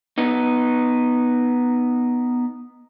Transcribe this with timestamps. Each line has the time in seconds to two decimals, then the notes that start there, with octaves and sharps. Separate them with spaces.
0.18 B3 D#4